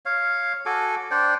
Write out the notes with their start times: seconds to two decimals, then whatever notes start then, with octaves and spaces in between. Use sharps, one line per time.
0.06 C#5 F5
0.66 F#4 A4 G#5 D6
1.11 D4 C5 D5 G5